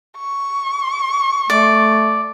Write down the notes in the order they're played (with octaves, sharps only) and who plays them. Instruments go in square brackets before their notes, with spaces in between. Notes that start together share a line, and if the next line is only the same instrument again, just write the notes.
[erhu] C#6
[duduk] A3 [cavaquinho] D5